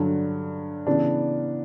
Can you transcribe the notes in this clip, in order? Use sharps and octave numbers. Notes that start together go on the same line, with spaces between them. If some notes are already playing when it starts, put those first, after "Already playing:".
Already playing: G2 D3 F#3
C#3 E3 B3 D4